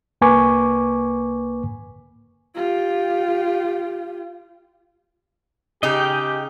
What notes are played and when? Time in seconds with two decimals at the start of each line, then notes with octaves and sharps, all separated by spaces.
0.21 C2 A#3 B4 G#5 C#6 D6
2.55 F4 G4
5.83 C#3 D#4 G4 G#4 D#5 G5